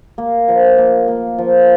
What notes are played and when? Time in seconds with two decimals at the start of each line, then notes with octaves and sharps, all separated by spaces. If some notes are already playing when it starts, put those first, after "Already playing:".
0.18 A#3
0.48 F3
0.78 A#3
1.08 A#3
1.38 F3